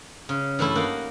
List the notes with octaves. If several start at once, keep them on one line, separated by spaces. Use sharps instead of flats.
C#3
G2 E3 A3 E4
A#3 D#4 F#5